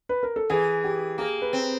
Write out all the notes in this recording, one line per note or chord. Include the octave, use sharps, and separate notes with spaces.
B4
A#4
A4
E3 G#4
G4
A#3 G#4
B4
C4